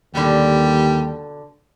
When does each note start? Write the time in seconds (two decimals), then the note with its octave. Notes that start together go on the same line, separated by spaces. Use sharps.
0.15 D#2 B2 D3 G3